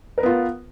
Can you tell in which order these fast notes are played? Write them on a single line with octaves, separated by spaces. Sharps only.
A#4 B4 B3 F4